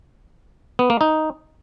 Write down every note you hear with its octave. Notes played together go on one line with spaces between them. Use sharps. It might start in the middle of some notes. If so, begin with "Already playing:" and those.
B3
A#3
D#4